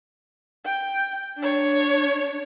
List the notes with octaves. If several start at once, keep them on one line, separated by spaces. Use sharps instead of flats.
G5
D4 C#5